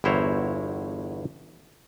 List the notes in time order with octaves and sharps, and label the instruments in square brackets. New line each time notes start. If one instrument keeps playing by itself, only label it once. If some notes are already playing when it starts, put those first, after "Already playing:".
[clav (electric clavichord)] G1 E2 E4 C5 C#5 A#5